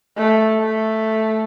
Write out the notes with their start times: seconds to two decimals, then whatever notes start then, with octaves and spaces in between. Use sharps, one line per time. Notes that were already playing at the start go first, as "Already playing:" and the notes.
0.17 A3
0.60 A3